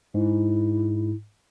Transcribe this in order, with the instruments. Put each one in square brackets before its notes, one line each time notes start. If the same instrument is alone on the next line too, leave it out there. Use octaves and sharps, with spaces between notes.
[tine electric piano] G#2 [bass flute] E4